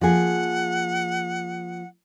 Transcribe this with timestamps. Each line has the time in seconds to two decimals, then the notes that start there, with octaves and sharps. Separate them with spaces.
0.01 F3 A#3 G#4 F#5